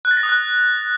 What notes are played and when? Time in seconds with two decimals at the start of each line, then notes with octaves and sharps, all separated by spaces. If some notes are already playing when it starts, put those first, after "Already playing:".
0.05 F#6
0.11 A6
0.17 A#6
0.23 D#6
0.29 F#6